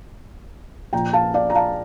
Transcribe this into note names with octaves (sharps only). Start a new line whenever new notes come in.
A#2 F3 G5 A#5
F5 A5
D5 F5
A#5
F5 A5